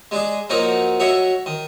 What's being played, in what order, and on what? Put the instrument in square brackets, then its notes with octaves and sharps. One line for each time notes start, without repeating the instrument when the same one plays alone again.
[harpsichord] G#3 D4 G#4
F3 F#3 A#3 D#4 F#4 A#4
F#4 C#5 D#5 E5
D#3